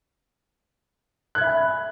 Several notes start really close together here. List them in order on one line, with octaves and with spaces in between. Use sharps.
F#6 G#6 E5 B5 G#5